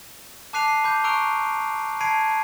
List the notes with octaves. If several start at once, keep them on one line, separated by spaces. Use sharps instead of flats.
A5 D6 F#6 C7 D#7 F7
C7
B5 D6 G6
A#5 C#6 E6 F#6 D7 F7
A5 B5 G#6 C7 D7 D#7